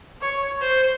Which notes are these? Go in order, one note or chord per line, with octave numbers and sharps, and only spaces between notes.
C#5
C5